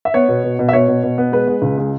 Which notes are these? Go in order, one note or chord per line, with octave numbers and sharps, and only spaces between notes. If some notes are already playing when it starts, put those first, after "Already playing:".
E5
B3 C#5
B2
B2
B2
E5
B2 C#5
B2
B2
B3
G#3 B4
G#3
C#2
G#3